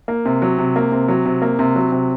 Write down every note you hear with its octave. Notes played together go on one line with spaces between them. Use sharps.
A#3
C3
F#3
C3
A#3
C3
F#3
C3
A#3
C3
F#3
C3